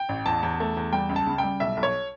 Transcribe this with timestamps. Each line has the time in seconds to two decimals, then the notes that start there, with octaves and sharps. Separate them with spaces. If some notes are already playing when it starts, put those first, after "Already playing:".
Already playing: G5
0.09 A1
0.26 E2 A5
0.43 E2
0.60 A3
0.77 E2
0.93 G3 G5
1.09 C#2
1.16 A5
1.27 C#3
1.38 G3 G5
1.60 B1 E5
1.77 B1
1.83 C#5